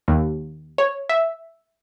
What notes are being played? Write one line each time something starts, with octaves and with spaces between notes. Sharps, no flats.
D#2
C#5
E5